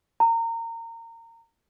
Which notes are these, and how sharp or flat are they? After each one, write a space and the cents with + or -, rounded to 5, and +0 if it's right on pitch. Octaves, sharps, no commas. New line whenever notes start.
A#5 -25